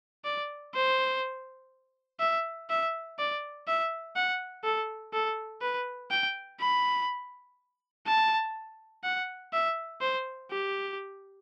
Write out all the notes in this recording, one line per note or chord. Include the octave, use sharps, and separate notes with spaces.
D5
C5
E5
E5
D5
E5
F#5
A4
A4
B4
G5
B5
A5
F#5
E5
C5
G4